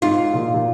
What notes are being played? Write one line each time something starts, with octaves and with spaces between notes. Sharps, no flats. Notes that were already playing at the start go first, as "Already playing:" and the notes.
G#2 F4
A#2
A#2